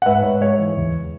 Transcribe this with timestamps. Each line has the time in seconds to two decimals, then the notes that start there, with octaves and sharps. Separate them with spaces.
0.02 F#5
0.06 G#2 B4 E5
0.23 G#2 C#5
0.41 G#3 C#5
0.59 E3
0.77 E2